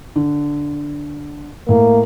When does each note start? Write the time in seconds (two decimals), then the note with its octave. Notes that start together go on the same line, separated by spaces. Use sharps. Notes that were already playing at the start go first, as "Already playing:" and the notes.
0.16 D3
1.69 A2 A#3